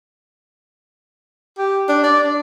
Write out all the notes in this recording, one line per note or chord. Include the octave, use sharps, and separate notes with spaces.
G4
D4
D5
D4